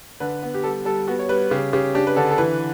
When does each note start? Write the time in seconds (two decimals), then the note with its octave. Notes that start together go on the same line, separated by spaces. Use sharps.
0.20 D3 B4
0.43 B3
0.54 G4
0.64 G3 A4
0.85 G3 A4
1.08 B3 F#4
1.19 C#5
1.29 G3 B4
1.51 C#3 G4
1.73 C#3 G4
1.95 D4 G4
2.07 B4
2.16 D3 A4
2.31 A4
2.38 E3 B4